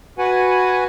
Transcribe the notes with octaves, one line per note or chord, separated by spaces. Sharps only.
F#4 B4 F#5 G#5